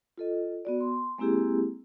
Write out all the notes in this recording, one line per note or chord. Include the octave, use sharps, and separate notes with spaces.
F4 A4 D#5
B3 F#4 D5
C6
G#3 A#3 C4 E4 G4 G#4